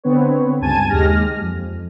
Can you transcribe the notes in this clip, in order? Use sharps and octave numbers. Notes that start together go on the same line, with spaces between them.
D3 B3 C4 B4 C#5
C#2 G2 G#5 A5 G#6 D#7
D#2 G#3 G4 F6 A#6
F2